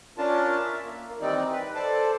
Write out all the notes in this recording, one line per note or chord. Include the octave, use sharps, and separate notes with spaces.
C#4 D4 F4 A#4 A5
E5
A#3
D#3 E3 G3 C4 D#4 D5
B4
A4 C5 D5 A5